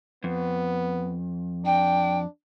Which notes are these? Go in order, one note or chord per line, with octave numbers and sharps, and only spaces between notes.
F2 B3
D4 G5